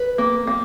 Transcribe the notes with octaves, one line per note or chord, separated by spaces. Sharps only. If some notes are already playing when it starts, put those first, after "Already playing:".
Already playing: B4
A#3
A#3